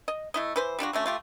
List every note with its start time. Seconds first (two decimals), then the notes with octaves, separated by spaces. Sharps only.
0.08 D#5
0.34 A3 E4 D#5
0.56 E3 B4 C5
0.79 G3 D4 F4 F#4
0.93 D3 F#3 A3 C#4
1.06 A3 F4 G4